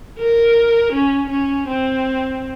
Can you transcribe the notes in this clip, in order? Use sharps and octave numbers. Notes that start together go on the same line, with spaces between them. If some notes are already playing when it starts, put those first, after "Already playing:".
A#4
C#4
C#4
C4